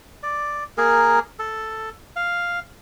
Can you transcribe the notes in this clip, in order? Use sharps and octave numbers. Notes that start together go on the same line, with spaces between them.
D5
A#3 G#4 A#4
A4
F5